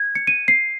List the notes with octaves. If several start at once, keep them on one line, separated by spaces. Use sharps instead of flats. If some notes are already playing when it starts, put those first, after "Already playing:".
Already playing: G#6
C#7
D#7
C7